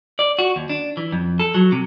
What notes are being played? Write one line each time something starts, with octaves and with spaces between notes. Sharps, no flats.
D5
F#4
D#2
D4
E3
F2
A4
F#3
C3